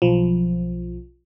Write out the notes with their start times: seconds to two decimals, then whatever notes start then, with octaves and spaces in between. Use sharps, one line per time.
0.02 B1 F3